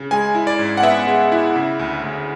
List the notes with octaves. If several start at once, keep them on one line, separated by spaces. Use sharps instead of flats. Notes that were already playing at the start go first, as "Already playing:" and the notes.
Already playing: C#3
G#3 G#5
E4
D5
G#2
F#5
B3 E5
G#3
E4
C#3
D2
D2